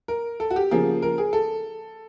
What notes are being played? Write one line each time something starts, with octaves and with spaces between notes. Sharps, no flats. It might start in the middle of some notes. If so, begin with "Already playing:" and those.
A#4
A4
F#4
G4
C#3 F3 A#3 G#4
A#4
G#4
A4